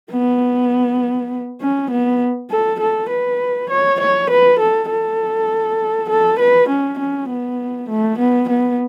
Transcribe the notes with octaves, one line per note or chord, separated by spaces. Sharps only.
B3
C#4
B3
A4
A4
B4
C#5
C#5
B4
A4
A4
A4
B4
C#4
C#4
B3
A3
B3
B3